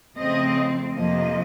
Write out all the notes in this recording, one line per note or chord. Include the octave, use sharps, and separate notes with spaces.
F2 C#3 F3 A3 C4 D#5
F2 C3 F3 A#3 D#5